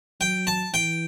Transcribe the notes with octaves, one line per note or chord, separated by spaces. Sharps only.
F#3 G5
A5
E3 G5